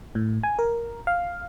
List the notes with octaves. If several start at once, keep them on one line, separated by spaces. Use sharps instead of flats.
A2
G#5
A#4
F5